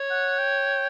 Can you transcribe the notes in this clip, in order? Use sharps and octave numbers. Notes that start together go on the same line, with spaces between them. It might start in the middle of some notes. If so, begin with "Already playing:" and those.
Already playing: C#5
F#5
G5